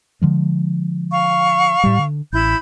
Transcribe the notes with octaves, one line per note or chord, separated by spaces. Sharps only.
D3 F3 G#3
F5 C#6
A2 G3
D3
A1 E4 B5 G6